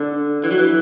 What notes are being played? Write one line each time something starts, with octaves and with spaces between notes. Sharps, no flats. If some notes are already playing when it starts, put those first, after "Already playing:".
Already playing: D3
E3
F#3
E3